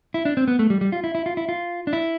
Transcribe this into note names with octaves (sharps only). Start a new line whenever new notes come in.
E4
D4
C4
B3
A3
G3
G3
F4
E4
E4
F4
E4
F4
D4
E4